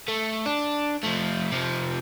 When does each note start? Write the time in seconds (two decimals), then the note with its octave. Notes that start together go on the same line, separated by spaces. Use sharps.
0.08 A3
0.46 D4
1.03 F3 A3
1.52 C3 F3